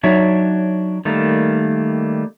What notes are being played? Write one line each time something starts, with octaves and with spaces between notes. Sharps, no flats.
F#3 D4 D#4 F#4 C#5 E5
D#3 G3 A3 A#3